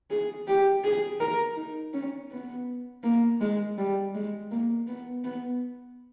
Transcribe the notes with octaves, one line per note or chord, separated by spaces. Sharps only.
G#4
G4
G#4
A#4
D#4
C#4
B3
A#3
G#3
G3
G#3
A#3
B3
B3